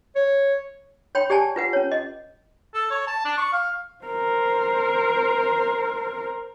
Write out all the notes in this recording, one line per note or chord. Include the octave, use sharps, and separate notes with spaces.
C#5
C#5 G5 B5
G4 D5 G#5 A5
F4 B4 F#5
C#4 C#5
D#5
A4
C#5
A5
D4
C#6
F5
A#4 C5